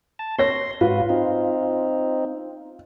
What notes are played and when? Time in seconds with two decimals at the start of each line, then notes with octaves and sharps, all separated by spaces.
0.19 A5
0.38 C#5 C6 A#6
0.81 G#2 F4 F#4 B4
1.09 C4 D#4